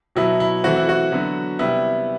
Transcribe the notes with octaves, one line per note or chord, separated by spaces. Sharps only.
B2 F#3 B3 E4
E4
E3 A3 C4 F#4
E4
F#4
D3 F#3 B3
C3 G3 B3 E4